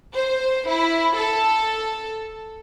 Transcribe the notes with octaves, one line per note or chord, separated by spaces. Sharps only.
C5
E4
A4